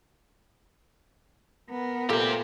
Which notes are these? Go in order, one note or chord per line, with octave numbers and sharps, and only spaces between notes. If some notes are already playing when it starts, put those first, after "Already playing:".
B3 A#4
A#2 G3 A3 G4 C5